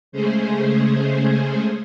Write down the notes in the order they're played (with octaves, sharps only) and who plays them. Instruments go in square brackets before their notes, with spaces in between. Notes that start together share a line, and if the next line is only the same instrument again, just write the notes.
[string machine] C#3 G#3 A3 C#4 G#4 C5